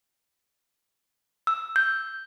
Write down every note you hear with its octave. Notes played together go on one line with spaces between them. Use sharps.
E6
G6